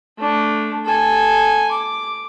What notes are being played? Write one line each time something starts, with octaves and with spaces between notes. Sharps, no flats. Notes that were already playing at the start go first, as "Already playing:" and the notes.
A3 D4
A4 G#5
D6